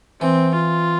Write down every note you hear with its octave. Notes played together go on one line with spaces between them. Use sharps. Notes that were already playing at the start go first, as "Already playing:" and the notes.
E3 C4
F4